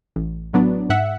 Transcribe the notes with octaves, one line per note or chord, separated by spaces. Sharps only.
A1
A2 F#3 B3 D4
G#2 E5 F#5